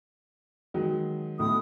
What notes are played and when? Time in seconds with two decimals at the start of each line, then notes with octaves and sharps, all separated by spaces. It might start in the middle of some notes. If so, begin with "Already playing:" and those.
0.74 D#3 F#3 G#3
1.39 B1 A2 D3 D#6